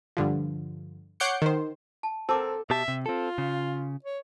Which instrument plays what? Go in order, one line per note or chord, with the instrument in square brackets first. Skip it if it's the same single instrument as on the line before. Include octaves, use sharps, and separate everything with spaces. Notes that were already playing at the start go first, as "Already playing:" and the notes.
[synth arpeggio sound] G2 D3 F3
C#5 F#5 D6 G6 C7 C#7
D#3 C5
[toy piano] A5
[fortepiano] C4 A#4 [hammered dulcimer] A4 [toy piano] A5 D6
[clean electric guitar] B2 G4 A5 [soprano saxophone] E5
[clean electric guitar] C3
[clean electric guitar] C4 A4 [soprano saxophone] F4
[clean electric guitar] C#3
[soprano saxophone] C#5